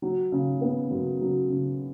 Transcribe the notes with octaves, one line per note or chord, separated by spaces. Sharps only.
F#3
C#3
B3
F#2
F#3
C#3